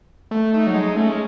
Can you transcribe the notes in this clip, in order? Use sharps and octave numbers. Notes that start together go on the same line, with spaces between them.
A3
A3 D#4
F#3
G#3
A3 C#4
G#3